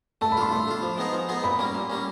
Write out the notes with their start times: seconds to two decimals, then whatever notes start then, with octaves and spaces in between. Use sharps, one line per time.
0.21 A3 A5
0.32 B5
0.37 D4 F4 C6
0.52 A3 B5
0.67 D4 F4
0.82 F3
0.98 G#3 B3 D#4 G#4
1.13 F3
1.29 G#3 B3 D#4 G#4
1.44 A#2 B5
1.59 G3 A#3 C#4
1.74 A#2
1.90 G3 A#3 C#4